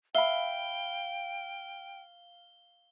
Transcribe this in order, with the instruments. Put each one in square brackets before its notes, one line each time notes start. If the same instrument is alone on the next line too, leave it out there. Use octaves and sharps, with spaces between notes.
[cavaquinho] E5 B5 [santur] F5 [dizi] G5 [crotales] G7